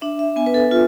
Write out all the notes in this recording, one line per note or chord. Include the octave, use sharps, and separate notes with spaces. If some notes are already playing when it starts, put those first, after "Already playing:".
D4 E5
E5
B3 G#5
B4
A4
F4